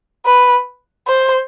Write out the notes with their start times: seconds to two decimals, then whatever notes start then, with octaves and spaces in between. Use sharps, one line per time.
0.26 B4
1.07 C5